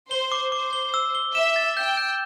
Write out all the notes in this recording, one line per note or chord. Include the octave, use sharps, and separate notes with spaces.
C5 G7
D6
C5 D6
G7
E6
G7
E5 E7
A6
G5 G6
G6